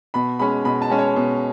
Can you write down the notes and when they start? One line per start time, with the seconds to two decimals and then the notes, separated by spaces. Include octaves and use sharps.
0.14 B2 B5
0.39 G#3 C#4 B5
0.65 B2 B5
0.82 A5
0.90 G#3 C#4
0.98 C#5
1.16 B2